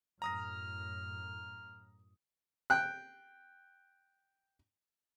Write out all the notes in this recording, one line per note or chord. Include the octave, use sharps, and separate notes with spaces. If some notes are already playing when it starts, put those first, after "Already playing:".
F#2 A2 A#5 D#6 F6 A#6
G5 F#6